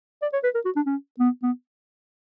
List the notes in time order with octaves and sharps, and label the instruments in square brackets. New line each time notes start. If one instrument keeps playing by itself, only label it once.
[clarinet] D5
C#5
B4
A#4
F#4
D4
C#4
B3
B3